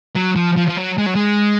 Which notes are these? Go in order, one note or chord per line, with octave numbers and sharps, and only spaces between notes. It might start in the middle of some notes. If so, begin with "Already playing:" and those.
F#3
F3
F3
F3
F#3
G#3
F#3
G#3